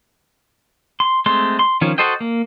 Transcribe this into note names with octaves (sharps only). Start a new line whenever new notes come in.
C6
G#3 A3 C4 C6
C6
D#3 F3 C#4
F#4 A4 C5 D#5 G5
A#3